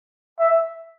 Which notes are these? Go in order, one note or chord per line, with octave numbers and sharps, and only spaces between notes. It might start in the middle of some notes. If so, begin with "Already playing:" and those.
E5